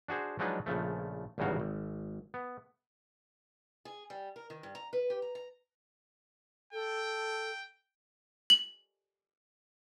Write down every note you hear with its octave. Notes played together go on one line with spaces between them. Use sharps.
D4 F#4 G#4 C5
F3 F#3 G#3 D4 D#4 B4
A#1 C#3 F3 A3
G#1 E2 G2 C#3 F#4 F5
G#1
B3
G#4
G3
A#4
D#3
G2
A#5
B4
G4
A#5
A#5
A4 G5
F#7